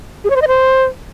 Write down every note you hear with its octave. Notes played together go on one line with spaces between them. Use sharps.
G#4
C#5
C5
D#5
C5